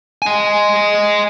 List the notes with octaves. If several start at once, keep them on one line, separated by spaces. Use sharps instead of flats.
D#5 G#5